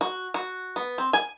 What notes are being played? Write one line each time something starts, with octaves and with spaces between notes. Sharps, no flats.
F#4
F#4
B3
C4
G#5